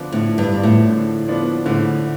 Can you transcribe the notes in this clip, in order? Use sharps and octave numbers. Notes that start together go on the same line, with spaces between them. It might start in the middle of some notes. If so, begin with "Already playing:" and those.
Already playing: D3 F3 B3 D4
A2 D3
G2
F3 B3 D4
A2
D3
F3 B3 D4
A2 D3